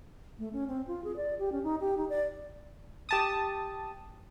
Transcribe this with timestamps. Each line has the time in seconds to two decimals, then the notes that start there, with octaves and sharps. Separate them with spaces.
0.39 A3
0.53 C#4
0.68 C4
0.87 F4
1.04 G#4
1.16 D5
1.39 G4
1.52 C#4
1.64 D#4
1.80 G4
1.97 D#4
2.09 D5
3.09 G4 A5 D#6